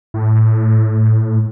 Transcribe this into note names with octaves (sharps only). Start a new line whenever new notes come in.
A2